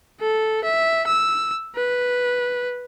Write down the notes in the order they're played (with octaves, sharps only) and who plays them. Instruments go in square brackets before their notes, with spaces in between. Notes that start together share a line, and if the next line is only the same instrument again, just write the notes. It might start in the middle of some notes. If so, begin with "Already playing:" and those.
[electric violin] A4
E5
E6
B4